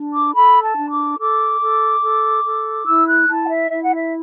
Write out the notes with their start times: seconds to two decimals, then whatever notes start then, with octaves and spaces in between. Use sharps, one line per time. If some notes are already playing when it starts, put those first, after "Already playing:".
Already playing: D4
0.13 D6
0.34 A4 B5
0.62 A5
0.76 D4
0.91 D6
1.19 A4 D6
1.60 A4
2.02 A4
2.44 A4
2.86 E4 E6
3.07 F#6
3.29 E4 A5
3.45 F#5
3.50 E5
3.70 E4 E5
3.82 F#5
3.93 E5